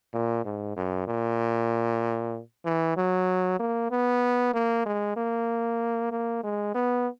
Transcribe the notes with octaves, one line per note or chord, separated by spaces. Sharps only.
A#2
G#2
F#2
A#2
E3
F#3
A#3
B3
A#3
G#3
A#3
A#3
G#3
B3